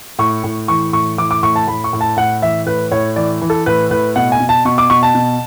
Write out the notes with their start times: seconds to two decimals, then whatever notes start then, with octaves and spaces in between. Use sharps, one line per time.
0.19 A2 C#6
0.44 A2
0.68 E3 C#6
0.93 A2 C#6
1.18 E3 D6
1.31 D6
1.43 A2 C#6
1.56 A5
1.68 A2 B5
1.84 C#6
1.93 A2
2.01 A5
2.17 A2 F#5
2.42 E3 E5
2.67 A2 B4
2.92 A2 C#5
3.16 E3 D5
3.42 E3
3.50 A4
3.66 A2 B4
3.91 A2 B4
4.16 B2 F#5
4.32 G#5
4.40 B2
4.49 A5
4.65 B2 C#6
4.78 D6
4.90 B2 C#6
5.03 A5
5.15 B2